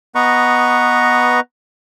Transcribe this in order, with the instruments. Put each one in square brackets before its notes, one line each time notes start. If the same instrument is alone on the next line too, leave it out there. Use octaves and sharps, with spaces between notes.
[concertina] B3 B4 D#5 A#5 C#6